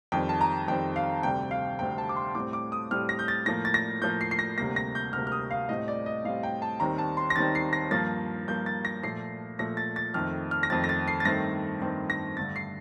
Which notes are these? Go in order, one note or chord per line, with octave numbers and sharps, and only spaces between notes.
F2 D#3 G3 C4 G5
A5
A#5
F2 D#3 G3 C4 G5
F5
D2 C3 G3 C4 G5
F5
D2 C3 G3 C4 G5
A5
D6
C6
A2 G3 C4 D6
D6
D#6
A2 G3 C4 F6
A#6
G6
A6
A2 F3 A#3 A#6
A6
A#6
A2 F3 A#3 G6
C7
C7
A#6
D2 C3 G3 A#3 A#6
A#6
G6
D2 C3 G3 A#3 F6
F6
D#6
F5
A2 G3 C4 D#5
D5
D#5
A2 G3 C4 F5
G5
A5
D#2 D#3 G3 C4 A#5
A5
C6
A#6
D#2 D#3 G3 C4 A6
C7
A#6
G2 F3 A#3 A6
G2 F3 A#3 G6
A6
A#6
A#2 F3 A3 C7
A#2 F3 A3 A#6
A6
A6
F2 D#3 A3 C4 F6
F6
A#6
F2 D#3 A3 C4 A6
A#6
A6
C7
A6
G2 D#3 A3 C4 A#6
G2 D#3 A3 C4
A#6
G2 D3 A3 A6
C7